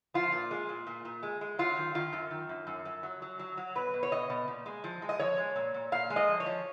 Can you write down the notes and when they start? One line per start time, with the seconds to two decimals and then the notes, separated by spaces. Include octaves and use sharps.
0.14 F3 F4
0.32 A#2
0.51 G#3
0.69 A#2
0.87 A#2
1.05 A#2
1.23 G#3
1.41 G#3
1.59 F#3 F4
1.77 D#3
1.94 D#3 F4
2.13 F#2
2.31 D#3
2.49 F#2
2.67 F#2
2.85 F#2
3.03 F#3
3.22 F#3
3.39 F#3
3.57 F#3
3.75 B2 B4
3.94 B2
4.03 C#5
4.12 B2 D#5
4.30 B2
4.48 A#2
4.66 G#3
4.84 F3
5.02 G#3
5.09 D#5
5.19 F3 C#5
5.38 G#3
5.56 A#2
5.74 A#2
5.92 A#2 F5
6.10 G#3
6.16 D#5
6.28 F3
6.40 C#5
6.46 F3